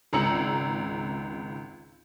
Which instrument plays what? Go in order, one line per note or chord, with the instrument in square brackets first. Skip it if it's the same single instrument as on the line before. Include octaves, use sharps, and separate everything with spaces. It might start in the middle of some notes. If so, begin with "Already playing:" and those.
[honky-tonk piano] G#1 C#2 A#5 E6 C#7 F#7